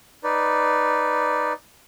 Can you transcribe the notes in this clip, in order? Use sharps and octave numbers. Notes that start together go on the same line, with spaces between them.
D#4 B4 D5